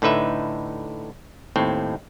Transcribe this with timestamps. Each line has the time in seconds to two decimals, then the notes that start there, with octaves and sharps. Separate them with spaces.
0.02 A2 D3 D#4 B4 E5
1.56 D#2 A2 C4